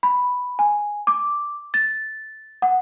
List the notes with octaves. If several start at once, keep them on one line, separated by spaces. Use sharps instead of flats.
B5
G#5
D6
A6
F#5